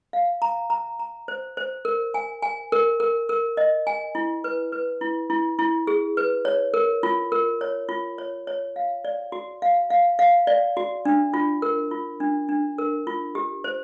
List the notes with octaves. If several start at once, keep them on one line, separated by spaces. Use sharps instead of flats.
F5
A#5
A#5
A#5
C5
C5
A#4
G#5
G#5
A#4
A#4
A#4
D#5
G#5
E4
B4
B4
E4
E4
E4
G#4
B4
C#5
A#4
F4
A#4
C#5
F4
C#5
C#5
F5
D5
F#4
F5
F5
F5
D5
F#4
D4
F4
A#4
F4
D4
D4
A#4
F4
G4
C5